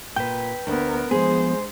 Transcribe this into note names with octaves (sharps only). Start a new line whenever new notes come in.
A#2 B4 G5
D2 B3 A#4
F3 G#3 B3 G#4 C5